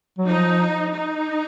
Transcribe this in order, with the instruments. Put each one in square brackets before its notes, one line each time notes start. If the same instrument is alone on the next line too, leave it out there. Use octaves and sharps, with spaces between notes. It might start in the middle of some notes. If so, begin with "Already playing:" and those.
[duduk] F#3
[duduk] F3 [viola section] D#4
[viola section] D#4